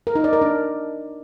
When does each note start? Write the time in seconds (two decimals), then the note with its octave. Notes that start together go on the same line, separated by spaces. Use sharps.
0.07 A#4
0.15 D#4
0.24 D5
0.33 A#4
0.42 D4